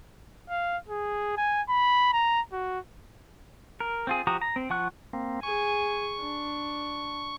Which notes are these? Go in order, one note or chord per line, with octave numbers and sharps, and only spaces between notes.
F5
G#4
G#5
B5
A#5
F#4
A#4
C4 F4 G#4
F3 F#4 G4 A#5 D#6
A#5
C4
F3 F#5 C#6 F#6
A#3 C4
G#4 G#5 C#6
D4